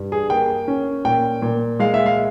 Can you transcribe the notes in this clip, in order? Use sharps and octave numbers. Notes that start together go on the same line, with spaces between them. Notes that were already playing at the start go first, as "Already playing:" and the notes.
Already playing: G2
G#4
A#3 G5
C#4
A#2 G5
A#2
G#3 F5
E5
F5